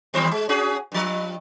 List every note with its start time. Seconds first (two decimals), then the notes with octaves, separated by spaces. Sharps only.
0.14 D#2 G3 C5
0.31 G#3
0.49 C#4 F#4 G#4
0.92 G2 F3